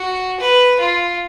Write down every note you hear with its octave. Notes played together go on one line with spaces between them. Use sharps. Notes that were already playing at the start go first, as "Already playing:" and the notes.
Already playing: F#4
B4
F4